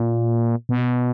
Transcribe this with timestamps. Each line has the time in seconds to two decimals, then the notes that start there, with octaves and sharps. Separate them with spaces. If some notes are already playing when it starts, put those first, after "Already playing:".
Already playing: A#2
0.69 B2